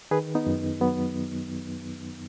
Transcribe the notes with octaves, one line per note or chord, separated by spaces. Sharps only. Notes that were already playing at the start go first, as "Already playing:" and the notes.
D#3 G#4 B4
B3 D#4
F#2
F#3 B3